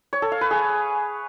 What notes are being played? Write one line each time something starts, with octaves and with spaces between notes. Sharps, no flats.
C#5
A4
F5
B4
G#4